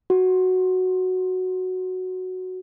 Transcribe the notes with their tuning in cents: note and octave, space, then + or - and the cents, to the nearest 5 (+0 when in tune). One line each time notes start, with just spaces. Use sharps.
F#4 +0